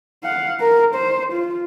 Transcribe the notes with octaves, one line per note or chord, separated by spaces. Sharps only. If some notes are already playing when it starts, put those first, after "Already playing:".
F5 F#5
A#4
C5
F4